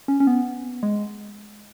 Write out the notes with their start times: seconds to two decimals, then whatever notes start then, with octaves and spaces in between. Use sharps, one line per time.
0.08 C#4
0.20 C#4
0.27 B3
0.83 G#3